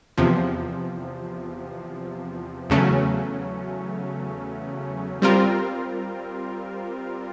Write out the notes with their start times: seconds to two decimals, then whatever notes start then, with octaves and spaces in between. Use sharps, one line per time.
0.18 E2 C3 F3
2.70 E2 C#3 F#3 A3 C#4
5.22 G3 C4 F4 A#4